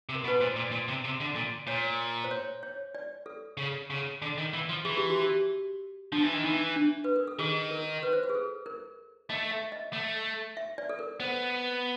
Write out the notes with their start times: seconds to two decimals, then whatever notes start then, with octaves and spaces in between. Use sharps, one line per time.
0.09 C3
0.15 A#4
0.24 B2
0.28 B4
0.40 A#2 C5
0.56 A#2
0.72 A#2
0.88 C3
1.04 C3
1.20 D3
1.36 A#2
1.67 A#2 C#5
2.24 C5
2.31 C#5
2.63 C#5
2.95 D5
3.26 A4
3.57 C#3
3.90 C#3
4.22 D3
4.38 D#3
4.54 E3
4.69 F3
4.85 E3 G#4
4.98 G4
5.10 F#4
5.22 G4
6.12 F3 D4
6.23 E3
6.34 D#3
6.44 E3 D#4
6.76 D4
7.04 B4
7.16 A#4
7.27 A4
7.39 D#3 G#4
7.71 A#4
8.03 B4
8.13 C5
8.23 B4
8.29 G#4
8.35 A4
8.66 A#4
9.30 A3 D#5
9.51 E5
9.72 D#5
9.93 A3
10.57 E5
10.78 D5
10.89 A4
10.99 A#4
11.20 B3 C5